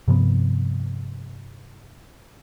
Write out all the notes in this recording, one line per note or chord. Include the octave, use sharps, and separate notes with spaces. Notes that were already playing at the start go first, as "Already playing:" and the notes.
G2 C3 F3 B3